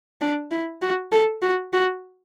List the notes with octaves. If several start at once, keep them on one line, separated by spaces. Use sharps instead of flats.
D4
E4
F#4
A4
F#4
F#4